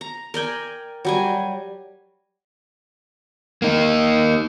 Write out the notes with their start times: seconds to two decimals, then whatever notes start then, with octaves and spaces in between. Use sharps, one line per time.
0.01 A#5
0.34 A#4 D5 G5 G#5
1.05 F#3 G3 G#5
3.62 A#3 D#4